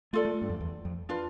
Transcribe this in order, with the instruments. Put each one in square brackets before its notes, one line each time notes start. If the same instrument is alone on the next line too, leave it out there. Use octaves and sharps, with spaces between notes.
[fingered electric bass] A3 [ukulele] F4 A4 D5
[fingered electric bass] A3
G2
F2
E2
F2
[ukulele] D4 F4 B4